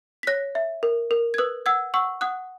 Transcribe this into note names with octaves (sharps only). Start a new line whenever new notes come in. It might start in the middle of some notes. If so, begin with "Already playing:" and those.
B6
C#5 F#6 A#6
E5
A#4
A#4
G#6
B4 D#6 F#6
F#5 E6 G#6
F#5 C#6 E6
F#5 D#6 F#6